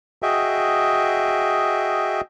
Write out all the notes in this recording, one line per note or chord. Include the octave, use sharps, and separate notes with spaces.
F#4 G#4 D#5 E5 G5